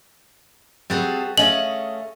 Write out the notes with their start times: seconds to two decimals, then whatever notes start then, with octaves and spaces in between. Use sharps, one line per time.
0.90 G3 C4 F#4 G#4 A4
1.38 A3 C#4 G#4 D#5 F5 F#7